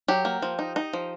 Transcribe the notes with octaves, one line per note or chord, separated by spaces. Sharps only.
F#3 G4
A#3
F3
D#4
D#4
F3